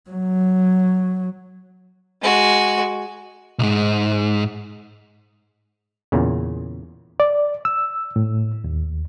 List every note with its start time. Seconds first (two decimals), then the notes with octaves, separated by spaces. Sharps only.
0.10 F#3
2.22 G#3 F#4
3.59 B1 G#2
6.12 E2 A#2 C#3
7.20 D5
7.65 E6
8.16 A2
8.64 D#2